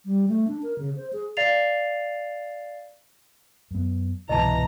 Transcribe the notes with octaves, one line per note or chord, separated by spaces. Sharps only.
G3
A3
D4
A#4
C#3
C5
G#4
D5 F5 A6 C7 F7
F#2 B3
C2 G#2 B2 E3 D#5 A5 A#5